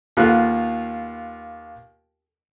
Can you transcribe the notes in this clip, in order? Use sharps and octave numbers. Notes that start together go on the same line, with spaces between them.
D#2 B3 F4 F#6